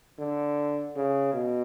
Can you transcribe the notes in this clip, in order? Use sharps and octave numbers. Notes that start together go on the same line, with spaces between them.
D3
C#3
B2